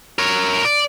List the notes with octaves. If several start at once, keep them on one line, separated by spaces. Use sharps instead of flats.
A#4 C#5
D5